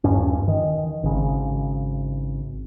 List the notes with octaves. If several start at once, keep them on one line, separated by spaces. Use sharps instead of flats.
D#1 G2 C#4
D#3
G#1 C#3